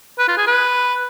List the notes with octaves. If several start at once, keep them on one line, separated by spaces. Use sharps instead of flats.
B4
F4
G#4
B4